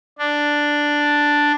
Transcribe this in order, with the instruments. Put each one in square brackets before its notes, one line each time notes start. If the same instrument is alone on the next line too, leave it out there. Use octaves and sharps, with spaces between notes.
[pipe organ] D4